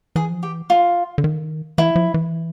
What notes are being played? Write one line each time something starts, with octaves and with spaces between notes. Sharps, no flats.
E3 G#4
F3
E3 G4
F4
D3
D#3
E3 E4
F3
E3